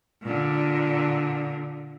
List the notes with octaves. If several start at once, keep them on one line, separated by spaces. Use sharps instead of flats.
A#2 D3